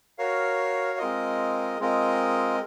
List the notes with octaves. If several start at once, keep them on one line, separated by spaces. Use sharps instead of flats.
F#4 A#4 C#5 F5
G#3 C4 F4 A#4 D#5
G#3 C4 F4 A#4 D#5